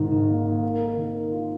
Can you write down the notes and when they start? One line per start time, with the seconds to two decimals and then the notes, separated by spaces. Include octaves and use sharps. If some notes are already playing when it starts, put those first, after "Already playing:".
Already playing: G#1 G#2 D#3
0.12 D#3
0.29 A#3
0.46 A#3
0.63 A#4
0.81 A#4
0.97 D#3
1.14 A#4
1.32 F4